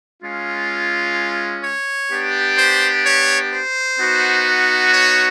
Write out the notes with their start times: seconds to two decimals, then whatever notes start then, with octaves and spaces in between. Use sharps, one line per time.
0.23 G#3 C#4 F4
1.64 C#5
2.10 B3 D4 G4
2.58 C5
3.05 C#5
3.51 C5
3.98 B3 D#4 F#4
4.92 C#5